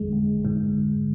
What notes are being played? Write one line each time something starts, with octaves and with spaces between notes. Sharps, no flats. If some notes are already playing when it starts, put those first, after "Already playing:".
Already playing: G#1 F2 D3 G#3
G#1
G#2